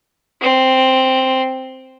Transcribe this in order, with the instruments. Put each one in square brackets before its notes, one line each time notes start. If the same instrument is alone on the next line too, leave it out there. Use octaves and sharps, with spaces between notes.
[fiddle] C4